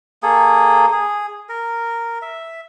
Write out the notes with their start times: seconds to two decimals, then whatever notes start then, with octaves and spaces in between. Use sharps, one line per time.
0.23 A#3 G#4 A4
0.92 G#4
1.49 A#4
2.22 E5